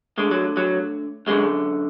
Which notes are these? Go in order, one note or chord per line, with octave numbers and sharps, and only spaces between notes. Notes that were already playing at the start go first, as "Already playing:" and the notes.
D2 D3 G#3
F#3
F#3
F#2 D3 G#3